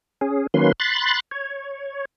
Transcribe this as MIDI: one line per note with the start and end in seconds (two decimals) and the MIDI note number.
0.21 0.47 61
0.21 0.47 68
0.54 0.72 51
0.54 0.72 54
0.54 0.72 58
0.54 0.72 61
0.54 0.72 71
0.54 0.72 84
0.80 1.20 83
0.80 1.20 84
0.80 1.20 90
0.80 1.20 93
1.31 2.05 73